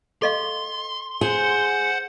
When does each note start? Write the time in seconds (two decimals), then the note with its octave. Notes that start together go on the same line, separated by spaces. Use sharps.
0.22 A4 D#5 F5 C6
1.21 G#4 C5 F#5